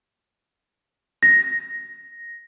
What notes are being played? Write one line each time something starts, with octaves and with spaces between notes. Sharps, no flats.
A#6